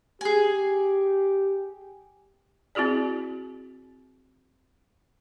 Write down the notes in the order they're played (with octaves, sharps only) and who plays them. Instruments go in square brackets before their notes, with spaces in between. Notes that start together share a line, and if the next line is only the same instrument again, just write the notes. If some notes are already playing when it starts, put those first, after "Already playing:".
[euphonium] G4 [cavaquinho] G#4 G#5
[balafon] C4 E4 F#4 G#4 D5